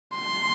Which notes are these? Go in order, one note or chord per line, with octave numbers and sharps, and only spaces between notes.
C6